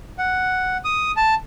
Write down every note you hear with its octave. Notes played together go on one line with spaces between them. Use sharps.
F#5
D#6
A5